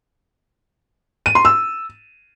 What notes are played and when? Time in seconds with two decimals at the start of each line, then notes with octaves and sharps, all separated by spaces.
1.26 D#7
1.35 C6
1.45 E6